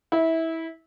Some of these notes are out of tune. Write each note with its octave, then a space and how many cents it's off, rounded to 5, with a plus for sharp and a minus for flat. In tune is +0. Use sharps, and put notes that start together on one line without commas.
E4 -20